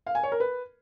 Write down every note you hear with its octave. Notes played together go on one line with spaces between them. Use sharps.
F5
G#5
C#5
A#4
B4